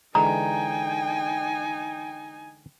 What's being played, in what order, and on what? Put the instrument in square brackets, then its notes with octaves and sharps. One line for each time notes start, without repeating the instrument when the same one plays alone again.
[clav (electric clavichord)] D3 E3 G#3 [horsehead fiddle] D#4 G#5 [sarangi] G5 [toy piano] A#5